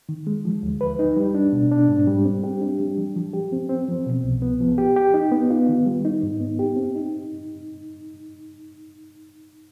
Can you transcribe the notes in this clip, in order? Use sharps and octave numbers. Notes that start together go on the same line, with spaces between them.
D#3
G#3
F3
D2
B4
D#4
G3
D4
B2
D4
G#2
G3
C4
G4
D4
G3
F3
F3
G4
C4
C4
F3
B2
C2
B3
F3
G4
G4
D#4
B3
F4
D#3
G3
D#4
G#2
B3
G4
C4
D#4